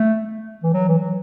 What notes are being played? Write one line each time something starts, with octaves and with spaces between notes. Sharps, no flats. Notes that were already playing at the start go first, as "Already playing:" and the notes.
Already playing: A3
E3
F#3
E3
F#3